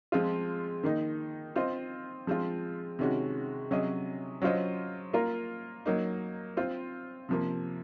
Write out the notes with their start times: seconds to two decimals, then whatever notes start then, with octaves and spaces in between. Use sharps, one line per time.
0.12 F3 G#3 C4 F4
0.83 D#3 A#3 D#4
1.56 C4 F4 C5 D#5
2.27 F3 G#3 C4 F4
2.99 C3 D#3 G#3 C#4 F#4
3.71 C3 F#3 C#4 G#4 D#5
4.42 F#3 C#4 F4 C5 D#5
5.13 A#3 F4 A#4
5.86 F#3 A#3 D#4
6.57 C4 F4 C5
7.29 C3 F3 A#3